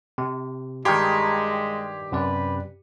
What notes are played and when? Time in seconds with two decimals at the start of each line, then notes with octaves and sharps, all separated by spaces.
0.18 C3
0.85 G2 D#3 G#3 G4 C6 G#6 B6
2.12 F#2 C3 B4 D5